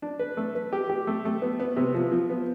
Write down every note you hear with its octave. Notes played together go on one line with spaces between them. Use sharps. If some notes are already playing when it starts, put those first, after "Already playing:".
D4
B4
A3
B4
G4
G4
A3
A3
B3
B3
C3
F3
F3
B3